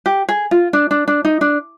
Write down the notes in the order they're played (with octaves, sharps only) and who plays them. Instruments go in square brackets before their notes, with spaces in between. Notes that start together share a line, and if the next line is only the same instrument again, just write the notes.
[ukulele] G4
G#4
F4
D4
D4
D4
D#4
D4